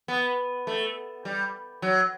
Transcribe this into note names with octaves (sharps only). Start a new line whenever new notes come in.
B3
A3
G3
F#3